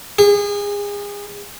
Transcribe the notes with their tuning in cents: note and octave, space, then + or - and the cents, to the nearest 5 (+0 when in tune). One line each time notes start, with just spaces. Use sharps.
G#4 -30